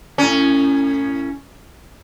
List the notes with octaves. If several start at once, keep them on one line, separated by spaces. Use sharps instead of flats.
A2 C#4